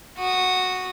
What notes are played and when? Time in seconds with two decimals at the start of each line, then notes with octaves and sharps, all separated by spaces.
0.18 F#4 D#6